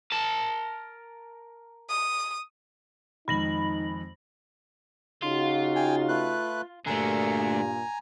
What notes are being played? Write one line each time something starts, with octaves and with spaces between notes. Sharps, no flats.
A#4 A5
D#6
F2 D#3 G#3 D#4 B5 A#6 F#7
C#3 D#4 F4 F#4
G5 G#5
A3 B4 F#6
G2 A#2 D3 A3 G#5 A#5